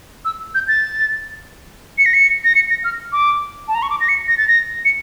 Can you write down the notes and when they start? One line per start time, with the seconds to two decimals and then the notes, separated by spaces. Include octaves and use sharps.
0.25 E6
0.55 G6
0.68 A6
1.98 C#7
2.06 A#6
2.14 C#7
2.44 A#6
2.55 C#7
2.70 A#6
2.84 F6
3.12 D6
3.68 A5
3.75 A#5
3.82 C#6
3.90 D6
4.01 A#6
4.09 C#7
4.28 A#6
4.38 A6
4.48 A#6
4.85 C#7